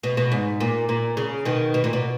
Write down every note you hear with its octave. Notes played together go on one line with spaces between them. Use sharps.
B2
B2
G#2
A#2
A#2
C#3
B2 D#3
B2
A#2
B2